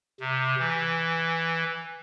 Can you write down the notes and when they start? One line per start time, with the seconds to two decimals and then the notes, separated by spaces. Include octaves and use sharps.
0.20 C3
0.59 E3